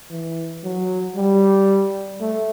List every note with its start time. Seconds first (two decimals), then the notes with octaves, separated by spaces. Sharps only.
0.11 E3
0.64 F#3
1.16 G3
2.21 A3